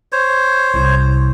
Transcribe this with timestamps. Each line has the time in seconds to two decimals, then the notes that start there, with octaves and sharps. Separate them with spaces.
0.12 C5 C#5
0.74 C2